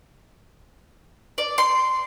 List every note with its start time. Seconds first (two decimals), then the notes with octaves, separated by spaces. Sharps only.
1.38 D5
1.58 C6